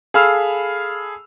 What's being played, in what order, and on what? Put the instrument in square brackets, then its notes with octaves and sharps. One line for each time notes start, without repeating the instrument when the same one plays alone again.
[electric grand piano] G#4 A4 F5 B5 E6 F6